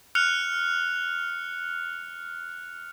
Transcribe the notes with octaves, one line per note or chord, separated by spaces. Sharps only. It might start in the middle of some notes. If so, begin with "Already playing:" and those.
F6 F#6 C#7 F7